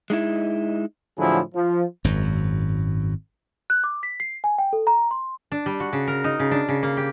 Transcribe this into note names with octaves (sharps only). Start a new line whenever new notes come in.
G#3 D#4 E4
A2 D3 F3 F#3 E4 G#4
F3
G#1 F#2
F#6
D6
B6
C7
G#5
G5
A4
A#5
C6
D4
G3
F#4
C#3
A#4
D#4
C#3
D4
C#3
A#3
G4